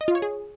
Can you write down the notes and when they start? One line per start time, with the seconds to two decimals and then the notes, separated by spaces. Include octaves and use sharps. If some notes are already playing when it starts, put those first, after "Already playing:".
0.01 D#5
0.08 F4
0.15 C#5
0.22 G#4